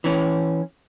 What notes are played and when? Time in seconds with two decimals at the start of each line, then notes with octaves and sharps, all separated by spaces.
0.04 E3 C#4